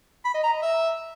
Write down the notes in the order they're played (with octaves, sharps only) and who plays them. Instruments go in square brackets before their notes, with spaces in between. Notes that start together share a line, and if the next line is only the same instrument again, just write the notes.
[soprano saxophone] B5
D#5
A#5
D#5
E5